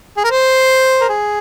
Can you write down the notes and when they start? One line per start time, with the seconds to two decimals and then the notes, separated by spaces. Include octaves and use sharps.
0.17 G#4
0.24 A#4
0.31 C5
1.01 A#4
1.09 G#4